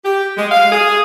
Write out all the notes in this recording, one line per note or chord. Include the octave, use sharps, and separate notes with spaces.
G4
G#3
F5
G#4